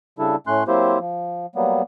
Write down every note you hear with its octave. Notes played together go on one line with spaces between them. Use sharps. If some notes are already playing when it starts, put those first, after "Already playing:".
C#3 G3 D4 E4 A4
A2 A3 C#4 C6 F#6
F#3 A#3 C4 E4 G4 C5
F3
F#3 G3 A#3 B3